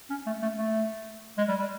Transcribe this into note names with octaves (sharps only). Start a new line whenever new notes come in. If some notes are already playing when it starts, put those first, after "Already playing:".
C#4
A3
A3
A3
G#3
G3
G3